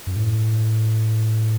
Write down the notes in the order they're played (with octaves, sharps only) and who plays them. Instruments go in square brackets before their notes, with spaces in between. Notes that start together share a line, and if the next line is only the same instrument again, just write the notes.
[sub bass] F#2
A2